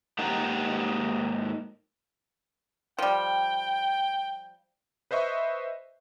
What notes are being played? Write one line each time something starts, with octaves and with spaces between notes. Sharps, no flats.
G#2 A#3 D#4 G4 F#5 A#5
F3 G3 G5
B4 C5 D#5 E5 C#6